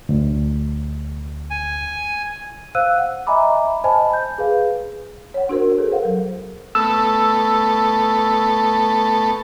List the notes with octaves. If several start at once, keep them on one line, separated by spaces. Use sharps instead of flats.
D2
G#5
C5 F5 E6 F#6 D#7
F#5
D#5 E5 G#5 A#5 B5 D6
C5 D#5 G#5 A5 B5
G6
G#4 B4 F5
C#5 F#5
D4 F#4 A#4 C5
G#4 A4 B4
A#4 C5 F5 F#5
F#3
A3 B3 A4 E6